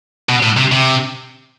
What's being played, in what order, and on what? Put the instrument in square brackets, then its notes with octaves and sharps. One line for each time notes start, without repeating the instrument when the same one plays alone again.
[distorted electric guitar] B2
A2
C3
C3